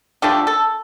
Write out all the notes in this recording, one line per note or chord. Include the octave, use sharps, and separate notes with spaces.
D3 F3 A3 D4 G4
A4